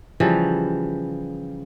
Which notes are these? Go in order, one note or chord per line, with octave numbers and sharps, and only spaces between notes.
C#3 E3 F3 G3